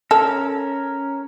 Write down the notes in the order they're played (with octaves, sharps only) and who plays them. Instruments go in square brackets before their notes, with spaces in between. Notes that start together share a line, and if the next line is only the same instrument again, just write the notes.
[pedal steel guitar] C#4 A#4 [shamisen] A4